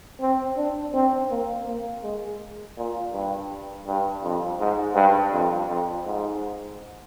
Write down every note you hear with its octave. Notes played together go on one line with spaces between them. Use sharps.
C4
D4
C4
A#3
A#3
G#3
A#2
G2
G2
F2
G#2
G2
F2
F2
G#2